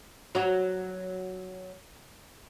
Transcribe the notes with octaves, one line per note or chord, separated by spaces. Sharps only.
F#3 F#4